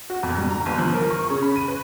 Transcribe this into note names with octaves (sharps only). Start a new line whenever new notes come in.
F#4
F2
G2
A#5
G1
F3
A#4
C#6
C#3
B5
D#7
B4